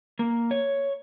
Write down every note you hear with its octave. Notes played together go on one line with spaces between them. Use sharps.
A#3
C#5